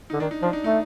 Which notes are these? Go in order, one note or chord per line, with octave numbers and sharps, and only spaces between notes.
D3 D#4
D#3 D4
D#4
F3 D4
D#4
A3 D#4